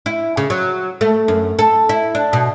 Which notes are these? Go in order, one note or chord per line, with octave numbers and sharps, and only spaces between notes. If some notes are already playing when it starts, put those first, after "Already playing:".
E4
C#3
F#3
A3
F#2
A4
E4
D4
B2